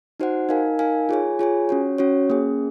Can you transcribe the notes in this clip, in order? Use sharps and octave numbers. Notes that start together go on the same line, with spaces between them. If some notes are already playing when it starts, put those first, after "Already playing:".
D#4 F#4 C5 F#5
D#4 A#4 F5 G#5
D#4 A#4 F5 G#5
F4 G#4 C#5 G#5
F4 G#4 C#5 G#5
C#4 F#4 C#5
C#4 F#4 C#5
A#3 C#4 G#4